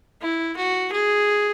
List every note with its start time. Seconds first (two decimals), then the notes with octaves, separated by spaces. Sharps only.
0.21 E4
0.56 F#4
0.92 G#4